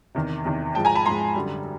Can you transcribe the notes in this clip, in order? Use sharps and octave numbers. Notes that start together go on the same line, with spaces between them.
E2 C3 D#3
E2 C3 D#3
G#2 F3 G#3 G5 A5
G#5 A#5
A5 B5
G#2 F3 G#3 A#5 C6
F#2 D3 G3